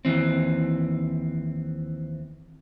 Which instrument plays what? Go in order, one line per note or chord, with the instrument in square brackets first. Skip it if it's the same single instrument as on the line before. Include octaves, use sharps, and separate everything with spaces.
[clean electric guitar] D#2 E3 C4